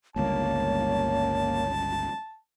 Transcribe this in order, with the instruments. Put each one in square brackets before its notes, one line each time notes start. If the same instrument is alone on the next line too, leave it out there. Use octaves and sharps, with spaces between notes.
[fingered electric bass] G1 C#2 G2 [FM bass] A#3 [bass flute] C#5 [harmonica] A5